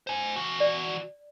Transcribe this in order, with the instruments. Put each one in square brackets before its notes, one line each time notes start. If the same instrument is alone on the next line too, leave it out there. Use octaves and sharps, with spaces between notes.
[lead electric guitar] C5 G#5
E3 F#4
[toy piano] D5